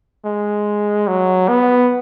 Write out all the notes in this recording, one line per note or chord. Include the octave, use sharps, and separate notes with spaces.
G#3
F#3
B3